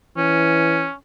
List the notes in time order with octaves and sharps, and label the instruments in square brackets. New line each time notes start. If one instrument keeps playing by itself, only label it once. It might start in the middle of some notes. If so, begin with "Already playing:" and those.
[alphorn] E3 [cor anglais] C#4